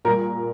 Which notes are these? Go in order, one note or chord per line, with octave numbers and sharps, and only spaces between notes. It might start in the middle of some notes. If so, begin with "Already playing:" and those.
A#2 G3 A#4